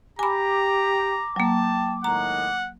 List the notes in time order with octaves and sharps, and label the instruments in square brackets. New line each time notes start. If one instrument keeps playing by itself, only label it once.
[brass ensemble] G4 [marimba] G#5 B5 [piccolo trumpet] A#5 [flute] D6
[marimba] F#3 A#3 [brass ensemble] G5 A5
[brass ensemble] A2 D#3 G#3 [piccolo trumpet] F#5 [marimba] A#5